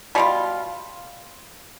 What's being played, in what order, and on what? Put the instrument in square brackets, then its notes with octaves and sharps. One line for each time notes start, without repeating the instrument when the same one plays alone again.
[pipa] B2 G3 C4 F4